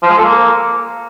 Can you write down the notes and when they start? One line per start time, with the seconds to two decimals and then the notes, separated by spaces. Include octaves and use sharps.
0.03 F3
0.10 G#3
0.17 A4
0.25 A#3